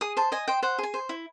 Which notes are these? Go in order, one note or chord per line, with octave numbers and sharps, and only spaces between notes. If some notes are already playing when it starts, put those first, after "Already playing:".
G#4 D#6
C5 A5
D#5 G#5
C5 G5
C5 F#5
G#4 G#5
C5
E4